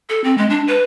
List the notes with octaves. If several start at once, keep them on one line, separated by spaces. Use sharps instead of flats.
A4
C4
G#3
D4
B4